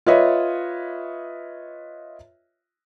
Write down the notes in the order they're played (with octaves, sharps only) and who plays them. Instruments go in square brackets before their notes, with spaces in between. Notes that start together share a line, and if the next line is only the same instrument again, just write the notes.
[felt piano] F4 B4 C#5 D#5 E5